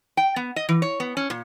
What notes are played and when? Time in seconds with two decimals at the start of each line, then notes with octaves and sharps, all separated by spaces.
0.17 G5
0.36 B3
0.56 D#5
0.69 E3
0.82 C#5
1.00 B3
1.17 C#4
1.30 A#2